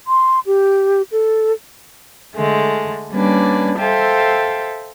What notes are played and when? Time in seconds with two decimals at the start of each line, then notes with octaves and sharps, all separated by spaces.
0.07 C6
0.46 G4
1.12 A4
2.36 D3 G#3 A3
3.12 G3 A#3 C#4 D4 B4 D5
3.78 A4 C5 E5 F5 G5